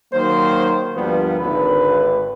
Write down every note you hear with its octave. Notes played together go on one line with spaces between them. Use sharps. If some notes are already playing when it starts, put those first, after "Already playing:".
D#3 F#3 A#3 C5
D2 G2 F3 G3 A#3 B3
G#1 D3 B4